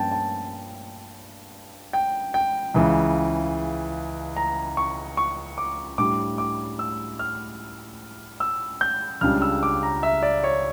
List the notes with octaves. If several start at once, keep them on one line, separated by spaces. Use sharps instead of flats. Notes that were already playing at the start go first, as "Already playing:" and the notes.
Already playing: G2 F3 A#3 C#4 G5 A5
A5
G5
G5
C#2 C#3 E3
A#5
C#6
C#6
D6
A2 G3 D4 D6
D6
E6
F6
E6
G6
C#2 C#3 G3 D4 F6
E6
D6
A#5
E5
D5
C#5